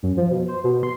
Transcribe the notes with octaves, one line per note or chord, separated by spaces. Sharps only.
F#2
F3
B2
C5
B2
C6